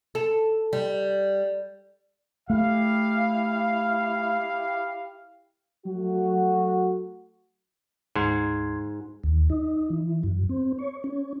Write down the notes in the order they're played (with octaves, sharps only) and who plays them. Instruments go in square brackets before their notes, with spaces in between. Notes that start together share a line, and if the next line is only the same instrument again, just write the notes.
[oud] A4
G3
[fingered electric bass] A3 [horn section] E4 G4 F5
[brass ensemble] F#3 A3 F#4
[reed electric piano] D2 C6 G#6 [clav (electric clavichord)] G#2
[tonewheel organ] D#2
D#4
E3
F#2
C4
C#5
C#4